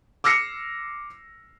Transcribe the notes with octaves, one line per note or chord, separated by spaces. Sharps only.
D6 E6 F6 A#6 C7 C#7